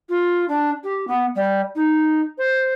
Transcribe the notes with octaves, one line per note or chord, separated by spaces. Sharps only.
F4
D4
G4
B3
G3
D#4
C5